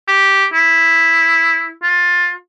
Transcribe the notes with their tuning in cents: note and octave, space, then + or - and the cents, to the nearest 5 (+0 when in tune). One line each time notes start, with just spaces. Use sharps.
G4 -5
E4 +0
F4 +20